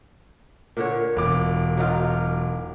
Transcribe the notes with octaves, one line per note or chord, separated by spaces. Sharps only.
A#2 D3 C#5
E1 D6
F#3 D#4 F4